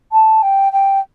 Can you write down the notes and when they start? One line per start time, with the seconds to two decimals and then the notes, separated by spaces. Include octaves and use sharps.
0.12 A5
0.42 G5
0.73 G5